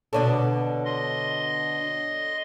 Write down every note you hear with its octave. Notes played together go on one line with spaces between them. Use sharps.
B2 D3 D4 A4 C#5 D5
D#5 C6